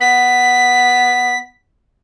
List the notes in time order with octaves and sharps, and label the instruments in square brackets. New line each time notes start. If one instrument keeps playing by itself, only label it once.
[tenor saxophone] B3 [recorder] B6